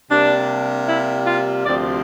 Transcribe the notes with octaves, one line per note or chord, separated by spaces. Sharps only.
C3 G3 A#3 D4
E4
F4
D2 C3 F3 C4 D5